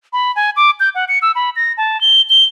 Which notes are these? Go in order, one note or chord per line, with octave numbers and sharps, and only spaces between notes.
B5
G#5
D6
G6
F#5
C#7
E6
B5
A#6
A5
G7
G7